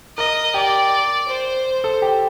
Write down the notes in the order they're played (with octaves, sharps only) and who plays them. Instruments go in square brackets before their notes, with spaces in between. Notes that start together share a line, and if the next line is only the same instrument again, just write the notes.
[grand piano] A#4 [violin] D#5
[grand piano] G4 [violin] D5
[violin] C5
[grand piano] A4
G4